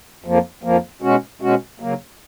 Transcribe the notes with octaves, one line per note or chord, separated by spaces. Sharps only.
F2 F3 A#3
F2 F3 A#3
B2 G#3 C#4 F#4
B2 G#3 C#4 F#4
C#3 F#3 A#3